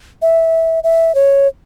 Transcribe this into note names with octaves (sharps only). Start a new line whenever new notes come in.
E5
E5
C#5